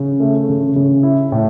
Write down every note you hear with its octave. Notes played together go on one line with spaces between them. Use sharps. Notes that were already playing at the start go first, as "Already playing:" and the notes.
Already playing: C#3
A3
C#3
C#3
E4
A2